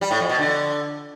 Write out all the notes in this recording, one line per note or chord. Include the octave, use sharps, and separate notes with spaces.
G3
A2
F2
B2
D3